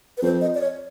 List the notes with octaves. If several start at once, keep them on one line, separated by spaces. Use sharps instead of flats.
B4
F2 C5
D#5
D5
C#5